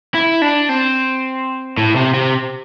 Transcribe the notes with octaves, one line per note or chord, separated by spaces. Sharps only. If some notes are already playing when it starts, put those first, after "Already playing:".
E4
D4
C4
A2
C3
C3